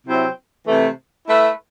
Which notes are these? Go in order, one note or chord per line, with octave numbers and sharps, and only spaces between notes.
C3 F#3 C4 E4
C3 E3 A3
A3 E4 B4 E5